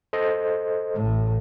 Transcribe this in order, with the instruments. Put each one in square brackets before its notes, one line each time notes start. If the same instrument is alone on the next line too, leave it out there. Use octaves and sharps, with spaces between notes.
[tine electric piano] A4 C5 D#5
[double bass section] A1 A2